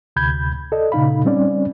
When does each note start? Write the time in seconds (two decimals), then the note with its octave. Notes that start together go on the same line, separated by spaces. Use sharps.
0.16 D2 C3 B5 G6 G#6
0.72 A4 D5 D#5
0.92 A#2 C#3 D#4 F5 B5
1.25 G3 C4 C#4 D5